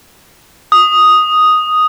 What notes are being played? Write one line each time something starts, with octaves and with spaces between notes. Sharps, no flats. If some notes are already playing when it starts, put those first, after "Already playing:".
D#6